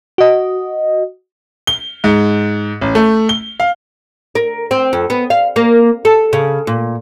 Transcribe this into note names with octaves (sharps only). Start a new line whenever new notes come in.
F#4 D#5
G7
G#2
A1
A3
G7
F5
A#4
C4
F2
B3
F5
A#3
A4
C#3
A#2